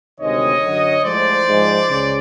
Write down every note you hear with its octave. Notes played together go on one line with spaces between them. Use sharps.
D2 C3 D#3 G#3 C#5 D#5
F#2 D3 F#3
A2 F3 G#3 C5 D5
G#2 F3 G#3
C#2 C#3